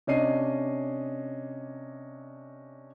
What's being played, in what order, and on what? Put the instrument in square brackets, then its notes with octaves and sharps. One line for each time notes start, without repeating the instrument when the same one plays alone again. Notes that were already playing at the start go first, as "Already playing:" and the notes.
[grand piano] C3 C#4 D4 D#5 C7 D#7